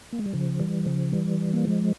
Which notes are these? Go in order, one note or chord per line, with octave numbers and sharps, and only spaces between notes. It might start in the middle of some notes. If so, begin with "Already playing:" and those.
A#3
G#3
G3
C#3 F3
E3 G3
C#3 F3
E3 G3
A#3
F3 G#3